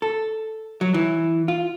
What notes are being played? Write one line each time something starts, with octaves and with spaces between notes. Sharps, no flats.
A4
F#3
E3
F4